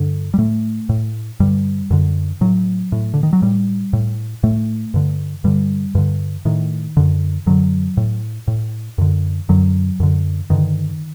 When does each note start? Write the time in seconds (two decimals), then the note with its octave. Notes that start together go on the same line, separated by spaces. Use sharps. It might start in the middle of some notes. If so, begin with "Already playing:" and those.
Already playing: G2 D3
0.34 G3
0.38 A2 A3
0.89 A2
1.40 G2 D3 G3
1.90 F#2 D3
2.41 A2 F#3
2.92 A2
3.14 D3
3.23 D#3
3.33 F#3
3.42 A2 G3
3.93 A2
4.43 A2 A3
4.94 G2 D3
5.44 G2 D3 G3
5.95 G2 D3
6.45 A2 D#3
6.97 F#2 D3
7.46 F#2 D3 F#3
7.97 A2
8.48 A2
8.98 F#2 D3
9.49 F#2 D3 F#3
10.00 F#2 D3
10.50 G2 D3 D#3